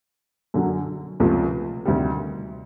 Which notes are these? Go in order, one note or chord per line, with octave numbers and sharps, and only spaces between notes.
F#2 D3 F#3
C#2 C3 F3 A3 C#4
D2 C3 D#3 G3